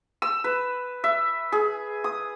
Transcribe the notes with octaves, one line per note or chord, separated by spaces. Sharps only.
E6
B4
E5
G#4
D#6